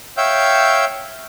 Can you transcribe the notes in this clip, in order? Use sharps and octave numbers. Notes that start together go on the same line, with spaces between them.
C#5 E5 F5 G5 E6 G6